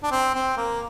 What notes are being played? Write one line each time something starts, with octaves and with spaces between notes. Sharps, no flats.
D4
C4
C4
A#3